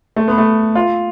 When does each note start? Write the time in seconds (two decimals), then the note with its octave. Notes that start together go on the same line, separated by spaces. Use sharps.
0.16 A3
0.28 B3
0.38 A3
0.75 F4